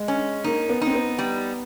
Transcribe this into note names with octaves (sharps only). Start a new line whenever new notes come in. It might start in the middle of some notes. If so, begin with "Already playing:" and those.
Already playing: G#3
C#4
A#3 D#4
B3
C4 D#4
B3
G3